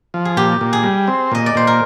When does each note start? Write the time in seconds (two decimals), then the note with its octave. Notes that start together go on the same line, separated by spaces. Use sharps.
0.14 F3
0.25 G#4
0.37 A#2 G4
0.61 A#2
0.73 G#4
0.83 G3
1.07 C4
1.32 A#2 D#5
1.46 D5
1.55 A#2 C5
1.67 A#4